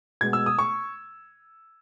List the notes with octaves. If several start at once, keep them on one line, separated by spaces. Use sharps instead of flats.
B2 G#3 B3 G#6
E6
D#6
C#6